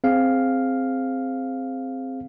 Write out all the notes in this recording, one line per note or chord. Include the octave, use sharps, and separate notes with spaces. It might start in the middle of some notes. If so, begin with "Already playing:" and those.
C4 G#4 F5